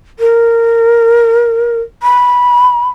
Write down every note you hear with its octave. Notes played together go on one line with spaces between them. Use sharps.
A#4
B5